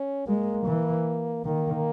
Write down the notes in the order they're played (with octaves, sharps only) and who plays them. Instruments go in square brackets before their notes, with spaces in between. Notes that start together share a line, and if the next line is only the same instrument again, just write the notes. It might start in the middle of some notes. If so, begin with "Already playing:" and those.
Already playing: [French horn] C#4
[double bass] G#3 [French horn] A#3
[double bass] E3
[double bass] D#3 [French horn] A#3